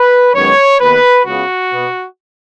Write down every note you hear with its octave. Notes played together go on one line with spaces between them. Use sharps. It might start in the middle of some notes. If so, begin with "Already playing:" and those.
Already playing: B4
F#2 D#3 G#3 B3 C#5
D#2 D#3 B3 B4
C#2 C#3 B3 F#4
B2 B3